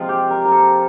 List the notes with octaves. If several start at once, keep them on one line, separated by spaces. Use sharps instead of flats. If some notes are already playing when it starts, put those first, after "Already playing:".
Already playing: C3 F3 G#3 F4
G4
A#4
A#4
A4